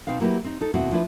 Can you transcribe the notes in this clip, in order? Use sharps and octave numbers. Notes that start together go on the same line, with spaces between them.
B2 C4 D#4 B4 F5
F#3 A#3 E4 F#4 G4 B4
C4 D#4
D#4 A4
D#2 B2 C4 E4 F#4
F3 D4 E4 B4